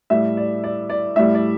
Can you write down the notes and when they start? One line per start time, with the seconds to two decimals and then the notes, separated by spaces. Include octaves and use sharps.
0.10 A2 G3 E5
0.37 D5
0.64 D5
0.90 D5
1.16 A2 G3 E5
1.35 D5